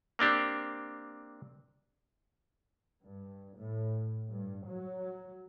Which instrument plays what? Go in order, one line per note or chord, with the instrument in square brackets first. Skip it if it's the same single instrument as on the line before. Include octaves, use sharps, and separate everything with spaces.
[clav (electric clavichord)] A#3 C4 D4 G4
[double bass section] G2
A2
G2
F#3